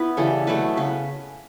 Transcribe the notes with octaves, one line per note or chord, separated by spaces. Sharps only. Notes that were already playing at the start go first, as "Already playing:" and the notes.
Already playing: B3 E4 B4
C#3 E3 G3 A4
B2 F#3 A3 B4
C#3 B4